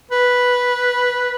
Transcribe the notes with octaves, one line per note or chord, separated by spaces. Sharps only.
B4